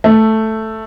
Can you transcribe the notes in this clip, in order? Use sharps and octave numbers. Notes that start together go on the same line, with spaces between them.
A3